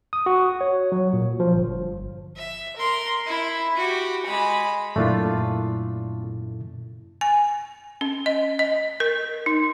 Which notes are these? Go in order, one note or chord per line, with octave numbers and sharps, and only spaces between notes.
D#6
F#4
C#5
F#3
A#2
F3
G1
E5
A#4 C6
E4
F#4 G4
G#3 B5
F#2 A#2 A3 D4 E4 F4
G#5
C#4
D#5
D#5
A#4
D#4